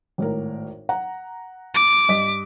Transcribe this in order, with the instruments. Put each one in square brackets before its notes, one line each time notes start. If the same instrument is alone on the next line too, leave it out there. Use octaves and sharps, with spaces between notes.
[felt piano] G#1 A2 A#4
F#5 A#5
[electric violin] D6
[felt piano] G2 D#5 B6